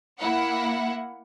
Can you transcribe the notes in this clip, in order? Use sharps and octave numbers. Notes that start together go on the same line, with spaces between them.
A#3 E4 F#5